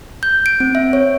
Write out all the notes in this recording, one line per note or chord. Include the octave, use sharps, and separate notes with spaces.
G6
D7
C4
E5
C#5